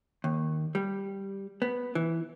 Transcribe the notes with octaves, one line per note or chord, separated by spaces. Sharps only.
D#2
G3
B3
E3